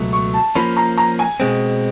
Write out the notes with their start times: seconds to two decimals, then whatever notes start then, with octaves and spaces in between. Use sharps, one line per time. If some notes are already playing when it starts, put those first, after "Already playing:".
Already playing: C#2 B2 F#3 A3
0.13 C#6
0.34 A5
0.55 F3 A#3 C#4 B5
0.77 A#5
0.98 A#5
1.19 G#5
1.40 B2 G#3 C4